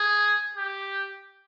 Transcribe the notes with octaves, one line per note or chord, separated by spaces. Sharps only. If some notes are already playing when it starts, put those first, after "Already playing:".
Already playing: G#4
G4